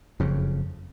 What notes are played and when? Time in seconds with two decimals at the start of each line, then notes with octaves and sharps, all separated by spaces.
0.20 F#1 F2 C#3